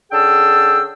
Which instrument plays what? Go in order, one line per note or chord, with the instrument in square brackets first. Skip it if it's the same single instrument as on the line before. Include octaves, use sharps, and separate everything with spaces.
[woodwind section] D3 C#4 G#4 G5 A5 E6